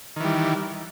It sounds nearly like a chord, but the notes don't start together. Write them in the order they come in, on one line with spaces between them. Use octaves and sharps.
D#3 E3 G3